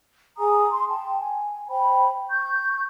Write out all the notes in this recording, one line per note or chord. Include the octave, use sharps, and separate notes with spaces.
G#4 G#5 A#5 D#6
C6
G5 A5
G#5
C5 G5 B5
C#6 G6